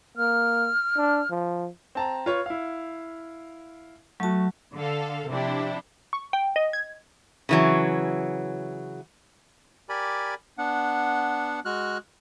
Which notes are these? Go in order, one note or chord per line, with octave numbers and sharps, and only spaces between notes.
A#3 F6
D4
F3
C4 A5 A#5
F4 B4 C#5
E4 F5
F#3 A3 F#4 A5
D3 A4 F5
C3 F3 D4 E4 G4
C#6
G5
D#5
G#6
C#3 E3 F#3
G4 A#4 D5 G#5 B5
B3 D4 F#5
G#3 F#4 F6 F#6